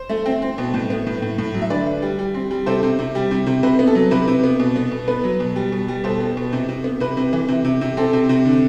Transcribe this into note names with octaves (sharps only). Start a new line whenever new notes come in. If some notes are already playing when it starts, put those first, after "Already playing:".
Already playing: C5
A3
C4
C4
B2
A2
B3
A2
A2
A2
F#3
E5
D3 B4 D5
D3
G3
G3
C4
G3
C3 A4 C5
C3
C3
G3
C3
C3
C3 B4
B3
A4
F#3
C3 B4
C3
B3
B2
B3
B2
B3 B4
F#3
B2
G3
B2
G3
B2 A4 C5
B3
B2
C3
C3
B3
C3 B4
C3
E3
C3
C3
C3
C4 A4
C3
C3
D3